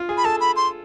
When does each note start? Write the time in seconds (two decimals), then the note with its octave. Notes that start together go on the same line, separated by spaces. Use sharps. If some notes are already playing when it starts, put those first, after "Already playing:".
Already playing: F4
0.09 G#4
0.17 B5
0.25 A4 A5
0.40 B5
0.56 C6